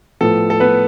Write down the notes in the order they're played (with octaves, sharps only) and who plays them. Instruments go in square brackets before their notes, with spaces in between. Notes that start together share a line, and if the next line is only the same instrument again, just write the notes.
[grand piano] A2 F3 B3 A4
A4
B3 B4